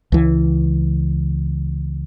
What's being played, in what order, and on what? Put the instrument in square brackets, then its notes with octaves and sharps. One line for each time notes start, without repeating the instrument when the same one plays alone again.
[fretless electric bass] C#2 E3